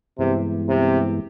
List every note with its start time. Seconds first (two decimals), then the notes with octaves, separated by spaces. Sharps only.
0.19 G2 C3 E3 G#3 B3 E4
0.69 C3